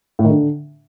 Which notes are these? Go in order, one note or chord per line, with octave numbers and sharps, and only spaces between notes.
A2
D#3
D3